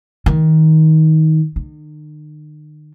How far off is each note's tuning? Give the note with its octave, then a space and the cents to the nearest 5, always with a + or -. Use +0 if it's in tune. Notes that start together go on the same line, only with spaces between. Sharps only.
D#3 +20
D#3 -45